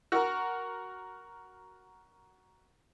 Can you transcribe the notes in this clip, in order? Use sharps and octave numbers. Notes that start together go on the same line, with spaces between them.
F#4 A#4